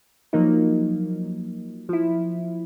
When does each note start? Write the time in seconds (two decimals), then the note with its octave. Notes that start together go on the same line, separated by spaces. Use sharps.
0.33 F3 F#3 A#3 D#4
1.89 F3 E4